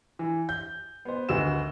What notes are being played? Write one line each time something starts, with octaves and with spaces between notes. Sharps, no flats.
E3
G6
B3 C5
G#1 D2 F#4 B4 E6 E7